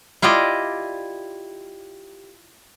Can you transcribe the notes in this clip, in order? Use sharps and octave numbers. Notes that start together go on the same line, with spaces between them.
E4 F4 G4 D5 D#5